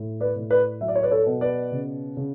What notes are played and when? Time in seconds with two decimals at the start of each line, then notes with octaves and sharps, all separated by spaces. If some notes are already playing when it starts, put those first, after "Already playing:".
Already playing: A2
0.21 B4 D5
0.36 A2
0.51 B4 D5
0.81 F#3 E5
0.88 D5
0.96 C#5
1.03 B4 D5
1.11 A4 C#5
1.26 B2
1.41 B4 D5
1.72 C#3
2.17 C#3